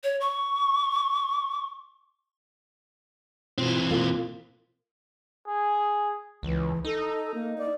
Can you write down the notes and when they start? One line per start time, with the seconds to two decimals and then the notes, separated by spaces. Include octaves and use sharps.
0.03 C#5
0.21 C#6
3.58 B2 E3 C4 F4
3.91 B2 A#3 F4
5.47 G#4
6.43 C#2 E3
6.85 D#4 A4
7.34 A#3
7.58 D5